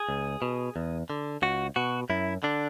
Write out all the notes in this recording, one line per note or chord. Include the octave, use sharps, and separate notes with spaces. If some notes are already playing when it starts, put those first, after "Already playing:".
Already playing: G#4
C#2
B2
E2
D3
C#2 F#4
B2 F#4
F#2 E4
D3 D4